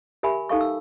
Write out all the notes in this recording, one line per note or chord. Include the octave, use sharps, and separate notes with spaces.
G4 A#4 E5 G#5 B5
D#4 A4 F5 C#6
E6